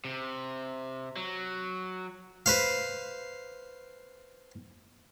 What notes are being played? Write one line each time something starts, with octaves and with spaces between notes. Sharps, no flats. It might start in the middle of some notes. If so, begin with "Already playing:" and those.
C3
F#3
B4 C5 F5